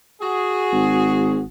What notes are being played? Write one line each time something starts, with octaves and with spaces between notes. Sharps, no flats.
F#4 G#4
G#1